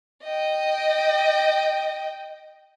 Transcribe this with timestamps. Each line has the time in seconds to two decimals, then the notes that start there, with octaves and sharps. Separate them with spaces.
0.23 D#5 G5